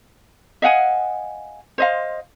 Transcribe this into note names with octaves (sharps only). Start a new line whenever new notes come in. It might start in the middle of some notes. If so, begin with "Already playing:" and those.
D#5 F5 F#5 G#5
C5 D#5 F5